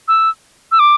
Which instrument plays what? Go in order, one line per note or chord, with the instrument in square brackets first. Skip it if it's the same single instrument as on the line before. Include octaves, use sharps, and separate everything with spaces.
[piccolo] E6
E6
D6